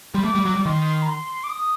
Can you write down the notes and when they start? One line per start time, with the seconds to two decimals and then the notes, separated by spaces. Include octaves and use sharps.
0.14 G3 C6
0.24 A3 D6
0.35 G3
0.45 F#3
0.55 G3
0.66 D#3 C6
1.02 A#5
1.08 C6
1.44 D6
1.49 D#6